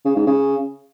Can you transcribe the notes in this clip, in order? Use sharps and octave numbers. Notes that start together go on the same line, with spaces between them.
C#3
G#2
C#3